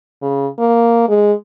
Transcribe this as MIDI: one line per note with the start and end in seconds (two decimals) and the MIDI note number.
0.22 0.48 49
0.59 1.06 58
1.09 1.33 56